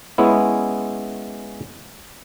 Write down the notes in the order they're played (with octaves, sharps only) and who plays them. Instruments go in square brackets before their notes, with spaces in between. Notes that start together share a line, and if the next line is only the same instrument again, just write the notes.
[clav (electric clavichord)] G#3 B3 C#4 E4